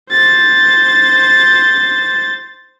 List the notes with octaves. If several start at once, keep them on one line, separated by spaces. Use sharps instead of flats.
C5 A6